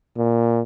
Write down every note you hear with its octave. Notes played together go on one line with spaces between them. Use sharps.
A#2